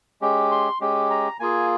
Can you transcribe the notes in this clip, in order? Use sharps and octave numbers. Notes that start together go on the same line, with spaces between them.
G#3 C#4 G4
C6
G#3 C#4 G4
A#5
A#3 F4 G#4 G#5